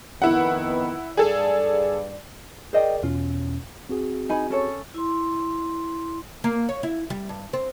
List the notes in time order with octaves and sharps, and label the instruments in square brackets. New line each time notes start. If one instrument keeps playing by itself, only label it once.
[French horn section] F2 D#3 B3 [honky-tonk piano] E4 F#5
[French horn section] G2 D5 [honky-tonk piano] G#4 A4
[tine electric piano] G#4 A#4 D5 [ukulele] C5 D#5 G5
[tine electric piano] E2 B2 C#4 [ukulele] F4
[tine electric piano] C4 F#4 G#4
[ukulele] D#4 G#5 B5
C#4 A4 C#5
[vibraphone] E4 C6
[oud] A#3
C#5
E4
G3
G2
C4